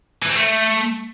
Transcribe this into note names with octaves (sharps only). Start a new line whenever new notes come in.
E3
C4
A3